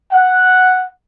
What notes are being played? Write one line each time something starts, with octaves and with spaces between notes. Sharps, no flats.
F#5